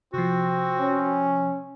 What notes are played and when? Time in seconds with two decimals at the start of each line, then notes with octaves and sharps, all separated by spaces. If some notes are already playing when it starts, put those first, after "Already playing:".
0.14 C3 F3 C4 F#4
0.78 C#4